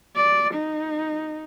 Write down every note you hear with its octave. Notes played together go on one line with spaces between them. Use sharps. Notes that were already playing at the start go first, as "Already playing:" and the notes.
D5
D#4